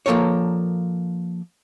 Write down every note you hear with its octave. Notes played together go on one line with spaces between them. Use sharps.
F3 A#3 A4 A#4 C#5